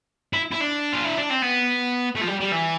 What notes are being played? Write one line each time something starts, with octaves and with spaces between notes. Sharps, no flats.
E4
E4
D4
F4
E4
D4
C4
B3
A3
F3
G3
G3
E3